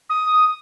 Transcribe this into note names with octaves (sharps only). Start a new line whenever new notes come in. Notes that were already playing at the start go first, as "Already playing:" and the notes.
D#6